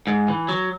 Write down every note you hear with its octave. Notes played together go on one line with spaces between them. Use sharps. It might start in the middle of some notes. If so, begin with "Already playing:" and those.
G#2
E3
F#3